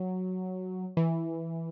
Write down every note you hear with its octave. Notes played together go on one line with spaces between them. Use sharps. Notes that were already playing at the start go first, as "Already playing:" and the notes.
Already playing: F#3
E3